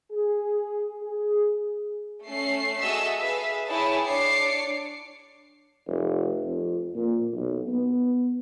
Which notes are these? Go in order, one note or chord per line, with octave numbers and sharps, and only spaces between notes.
G#4
G#4
A3 C#4 C7
F#4 G#4 A4 D#5 E5 E6
G#4 B4 E5 F5
E4 G#4 C#5 G5 A5
D4 C#5 D6 C7 C#7
F1
F2
A#2
B1
B3